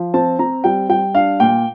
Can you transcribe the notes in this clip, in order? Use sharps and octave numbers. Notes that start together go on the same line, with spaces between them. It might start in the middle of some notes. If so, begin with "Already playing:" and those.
Already playing: F3
C4 A5
C4 A#5
G3 G5
G3 G5
D4 F5
A#2 G5